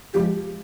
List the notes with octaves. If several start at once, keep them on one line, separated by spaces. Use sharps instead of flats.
F3 G#3 G4